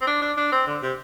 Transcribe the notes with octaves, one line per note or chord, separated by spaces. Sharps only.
C4
D4
D4
D4
C4
D3
C3